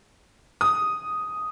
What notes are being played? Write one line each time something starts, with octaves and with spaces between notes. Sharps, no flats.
D#6